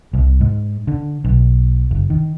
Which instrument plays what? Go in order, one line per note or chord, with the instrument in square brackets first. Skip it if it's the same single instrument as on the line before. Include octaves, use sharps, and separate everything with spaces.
[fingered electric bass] C2
G#2
D3
B1
F#1
D#3